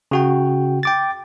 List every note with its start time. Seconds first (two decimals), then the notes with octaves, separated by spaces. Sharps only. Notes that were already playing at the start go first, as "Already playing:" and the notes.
0.11 C#3 F#4 G5
0.83 G5 D6 A6